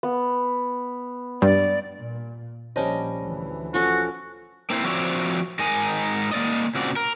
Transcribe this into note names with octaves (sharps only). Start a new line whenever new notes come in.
B3
G2 D5
A#2
A#1 G3 C#4 C5 C#5 D#5 A5
D2 E3
F3 C#4 F#4 A4
A#3 C4 E4 C5
F3 C4 F#4 C#5 D5 E5
G#2 D#4 A#4 D#5 G#5
A#3 D5 D#5
A#2 C#3 C4 F#4 D5
A#4